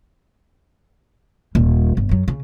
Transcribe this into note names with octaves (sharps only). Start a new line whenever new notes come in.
D#1 G3
G1
F#2 F#3
C#3